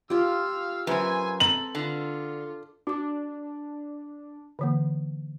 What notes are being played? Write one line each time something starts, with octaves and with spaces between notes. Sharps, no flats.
F4 G4 F5 E6
F#2 B4 C5 G#5 E6
C4 A4 A#5 F#7
D3 F4
D4 F#4 D6
D3 E3 A#3